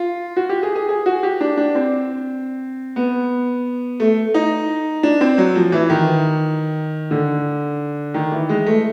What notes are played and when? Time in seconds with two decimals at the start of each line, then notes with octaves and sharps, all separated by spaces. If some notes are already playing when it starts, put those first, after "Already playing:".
Already playing: F4
0.36 F#4
0.49 G4
0.63 G#4
0.75 G#4
0.89 G#4
1.06 F#4
1.23 G4
1.41 D4
1.57 D4
1.75 C4
2.96 B3
4.00 A3
4.34 D#4
5.03 D4
5.21 C4
5.38 F#3
5.55 F3
5.72 E3
5.90 D#3
7.11 D3
8.14 D#3
8.32 E3
8.49 G#3
8.66 A3